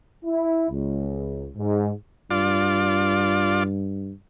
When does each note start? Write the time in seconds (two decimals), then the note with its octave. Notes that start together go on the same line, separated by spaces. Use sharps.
0.25 E4
0.70 C#2
1.58 G#2
2.31 G2 F4 D5